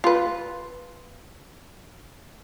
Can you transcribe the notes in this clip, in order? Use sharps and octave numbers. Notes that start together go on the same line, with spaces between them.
F4 B4